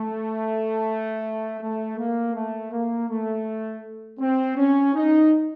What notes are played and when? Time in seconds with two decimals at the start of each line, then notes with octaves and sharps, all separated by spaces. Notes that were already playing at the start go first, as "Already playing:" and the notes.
Already playing: A3
1.60 A3
1.97 A#3
2.34 A3
2.71 A#3
3.08 A3
4.19 C4
4.56 C#4
4.94 D#4